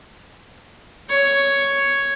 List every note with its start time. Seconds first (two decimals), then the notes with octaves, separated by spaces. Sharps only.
1.09 C#5